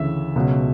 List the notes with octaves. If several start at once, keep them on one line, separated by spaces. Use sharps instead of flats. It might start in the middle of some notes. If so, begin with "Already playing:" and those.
Already playing: D2 C#3 E3 E5
C#2 B2 F#3